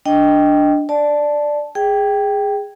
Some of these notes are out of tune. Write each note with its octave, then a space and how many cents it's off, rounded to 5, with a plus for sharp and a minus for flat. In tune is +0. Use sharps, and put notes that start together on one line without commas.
D4 +0 D#5 +0 G5 +0
D5 +5 A5 -10
G#4 -10 G5 +0